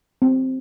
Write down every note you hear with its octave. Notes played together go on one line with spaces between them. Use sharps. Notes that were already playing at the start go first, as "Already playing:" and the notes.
C4